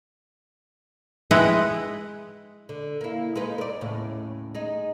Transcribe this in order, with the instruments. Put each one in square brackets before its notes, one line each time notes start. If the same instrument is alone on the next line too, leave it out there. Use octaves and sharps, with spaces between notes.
[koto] G#3 E4 B4 D#5 F#5 G5
[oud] D3
A#3 E4
G#3 D#4 B4
A#4 D5
D#2 A2 C#3
G#3 D#4